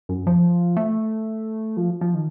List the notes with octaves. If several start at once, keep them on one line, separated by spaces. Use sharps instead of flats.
F#2
F3
A3
F3
F3
D#3